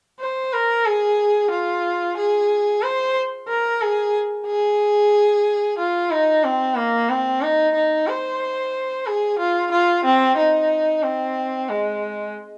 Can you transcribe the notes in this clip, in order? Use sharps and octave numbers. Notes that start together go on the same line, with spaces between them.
C5
A#4
G#4
F4
G#4
C5
A#4
G#4
G#4
F4
D#4
C4
A#3
C4
D#4
D#4
C5
G#4
F4
F4
C4
D#4
C4
G#3